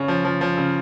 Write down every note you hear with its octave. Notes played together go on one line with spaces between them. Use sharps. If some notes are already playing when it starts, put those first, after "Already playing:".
Already playing: C#3 C#5
F3
F3
F3
C#3